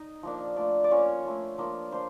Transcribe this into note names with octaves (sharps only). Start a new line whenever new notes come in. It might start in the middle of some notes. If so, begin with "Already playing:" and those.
Already playing: D#4 D#5
F3 A#3 D4
A3 D4 F4 D5
D5
A#3 C#4 F4 C#5
A3 D4 F4
F3 A#3 D4 F4
D4 F4 C5